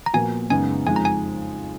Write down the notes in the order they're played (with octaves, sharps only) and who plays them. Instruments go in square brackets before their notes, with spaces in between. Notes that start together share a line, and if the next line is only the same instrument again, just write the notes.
[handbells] A#5
[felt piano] A#2 F3 B3 F#4 A#4 [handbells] G#5
[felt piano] F#2 C#3 G#3 B3 D#4 [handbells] G#5
[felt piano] F2 F3 G#3 D#4 [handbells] G#5
[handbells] A#5
G#5